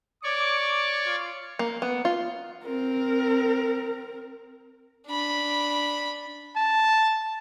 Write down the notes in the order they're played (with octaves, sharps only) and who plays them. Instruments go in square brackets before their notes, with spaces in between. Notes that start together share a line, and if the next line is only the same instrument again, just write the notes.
[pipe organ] C#5 D5 C#6 [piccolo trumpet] D6
[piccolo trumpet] F4
[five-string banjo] A#3
B3
F4
[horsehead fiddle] C4 A#4
[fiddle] D4 B5
[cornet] A5